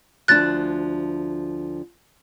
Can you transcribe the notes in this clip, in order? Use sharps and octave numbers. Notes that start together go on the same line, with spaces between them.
D2 F3 D4 F#6 A6